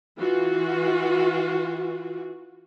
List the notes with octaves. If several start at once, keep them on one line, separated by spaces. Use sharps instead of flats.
E3 F4 F#4